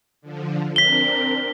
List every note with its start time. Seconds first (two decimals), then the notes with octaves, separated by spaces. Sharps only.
0.21 D3 F3
0.76 C4 D4 A#4 B6 G7